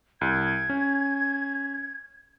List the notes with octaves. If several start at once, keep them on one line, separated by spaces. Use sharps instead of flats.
C2 G#6
C#4